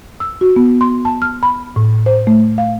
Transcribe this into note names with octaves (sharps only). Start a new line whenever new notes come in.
E6
F#4
B3
C6
A5
F6
B5
A2
C5
A3
F5